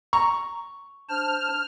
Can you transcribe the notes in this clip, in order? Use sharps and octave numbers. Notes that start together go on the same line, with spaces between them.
A#5 C#6
D4 C5 A5 F6